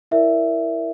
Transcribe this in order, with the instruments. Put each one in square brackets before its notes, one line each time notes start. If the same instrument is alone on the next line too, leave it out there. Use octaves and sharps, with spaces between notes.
[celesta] E4 A#4 D5 E5